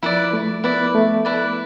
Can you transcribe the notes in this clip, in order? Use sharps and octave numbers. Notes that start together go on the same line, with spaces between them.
F3 E4 B4 D5
A3
B3 E4 B4 D5
A3
E4 B4 D5